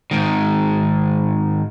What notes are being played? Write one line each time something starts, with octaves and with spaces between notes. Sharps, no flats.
G#2 D#3